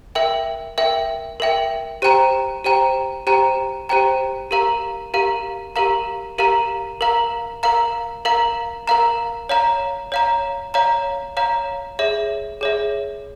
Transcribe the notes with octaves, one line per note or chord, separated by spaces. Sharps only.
A#4 E5 G5
A#4 E5 G5
A#4 E5 G5
G4 C5 G5 A#5
G4 C5 G5 A#5
G4 C5 G5 A#5
G4 C5 G5 A#5
G4 A#4 F5 A#5
G4 A#4 F5 A#5
G4 A#4 F5 A#5
G4 A#4 F5 A#5
A#4 F5 A#5
A#4 F5 A#5
A#4 F5 A#5
A#4 F5 A#5
C#5 F5 A#5
C#5 F5 A#5
C#5 F5 A#5
C#5 F5 A#5
G#4 C#5 E5
G#4 C#5 E5